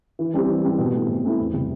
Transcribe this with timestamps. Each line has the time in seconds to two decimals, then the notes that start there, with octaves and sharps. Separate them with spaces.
0.19 E3
0.34 G3 C4 G4
0.49 E3
0.63 G3 C4 G4
0.78 B2
0.93 A3 C4 E4
1.09 B2
1.24 A3 C4 E4
1.39 E2
1.53 C3 G3